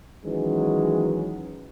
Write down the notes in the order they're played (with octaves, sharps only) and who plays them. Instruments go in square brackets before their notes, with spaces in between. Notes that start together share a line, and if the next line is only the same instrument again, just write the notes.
[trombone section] D#3 E3 F#3 G#3 C#4